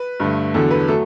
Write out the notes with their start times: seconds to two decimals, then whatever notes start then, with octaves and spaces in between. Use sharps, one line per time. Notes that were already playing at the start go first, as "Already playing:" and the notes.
Already playing: B4
0.20 G2 D3 A3
0.54 E2 D3 F#3 A4
0.71 B4
0.88 F#3 A3 A4